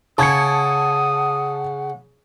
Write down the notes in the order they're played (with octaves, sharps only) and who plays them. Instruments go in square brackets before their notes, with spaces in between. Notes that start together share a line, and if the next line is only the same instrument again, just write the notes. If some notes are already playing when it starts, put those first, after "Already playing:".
[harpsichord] C#3 [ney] F#5 [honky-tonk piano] A5 G#6 C#7 [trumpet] D#6